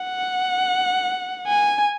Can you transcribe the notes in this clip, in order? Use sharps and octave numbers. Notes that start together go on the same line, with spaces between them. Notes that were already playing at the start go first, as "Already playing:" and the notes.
Already playing: F#5
G#5